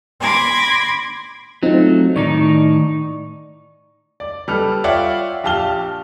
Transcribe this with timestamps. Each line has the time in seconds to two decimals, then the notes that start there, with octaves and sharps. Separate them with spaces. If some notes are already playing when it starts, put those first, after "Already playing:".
0.20 B5 C6 D6 G#6 A#6
1.63 F#3 A3 C4 D#4 F4
2.16 A2 D#3 D#4 D5 C#6
4.20 D5
4.48 G3 A4 B4 F6
4.84 F4 C#5 D5 E5 F#5 G5
5.43 A#1 G4 F5 A5 F6 G7